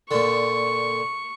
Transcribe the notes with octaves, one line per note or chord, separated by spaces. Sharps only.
A#2 D3 C#6